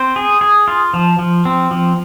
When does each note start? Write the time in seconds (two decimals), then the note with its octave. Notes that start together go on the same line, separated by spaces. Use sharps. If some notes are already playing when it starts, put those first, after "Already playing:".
Already playing: C4 C5
0.16 G#4
0.41 G#4
0.68 F4
0.94 F3
1.19 F3
1.46 C4
1.71 F3